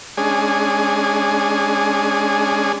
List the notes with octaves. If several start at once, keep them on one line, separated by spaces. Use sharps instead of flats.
G#3 C#4 D4 G#4